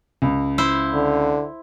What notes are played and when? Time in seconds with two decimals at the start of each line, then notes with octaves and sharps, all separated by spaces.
0.22 C#2
0.58 E4 C5
0.94 D3